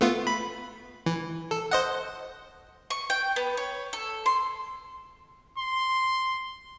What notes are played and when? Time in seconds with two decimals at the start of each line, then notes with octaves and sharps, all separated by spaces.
0.01 A3 B3 F4
0.27 B5
1.06 E3
1.51 A4
1.71 C5 D#5 F#5
2.90 C#6
3.10 G5
3.36 B3
3.57 C#5
3.93 A4
4.26 C6
5.58 C6